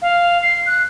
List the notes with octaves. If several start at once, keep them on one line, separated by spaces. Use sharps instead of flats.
F5
C7
F#6